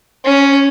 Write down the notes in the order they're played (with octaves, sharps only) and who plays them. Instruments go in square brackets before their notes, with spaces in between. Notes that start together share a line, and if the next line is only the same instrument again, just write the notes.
[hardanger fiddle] C#4